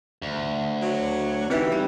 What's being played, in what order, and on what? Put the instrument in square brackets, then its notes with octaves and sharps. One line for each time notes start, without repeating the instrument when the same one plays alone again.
[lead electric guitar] D2
[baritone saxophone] F#3
[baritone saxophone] E3 [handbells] C4 D#4 [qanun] G4 B4 E5
[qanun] G3